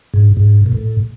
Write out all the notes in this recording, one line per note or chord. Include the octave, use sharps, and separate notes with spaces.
G#2
G#2
A#2
A2